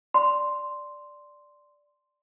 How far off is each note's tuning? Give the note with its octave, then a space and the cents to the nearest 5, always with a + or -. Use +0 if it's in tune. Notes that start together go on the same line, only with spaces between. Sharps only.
D5 +0 C6 +0